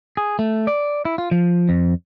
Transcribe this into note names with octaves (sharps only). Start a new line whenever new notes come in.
G#4
A3
D5
E4
F4
F3
F2